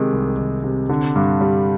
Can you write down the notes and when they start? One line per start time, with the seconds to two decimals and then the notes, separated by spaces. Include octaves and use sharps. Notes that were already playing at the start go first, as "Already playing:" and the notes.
Already playing: C3 D#3 G#3
0.13 C2
0.38 D#3
0.64 C3
0.89 D3
1.16 G2
1.41 G3